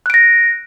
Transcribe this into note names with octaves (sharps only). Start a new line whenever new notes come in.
F#6 A#6 D7